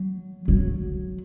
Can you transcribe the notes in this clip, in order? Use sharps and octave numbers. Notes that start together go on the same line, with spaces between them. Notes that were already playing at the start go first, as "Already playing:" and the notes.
Already playing: F#3
F#3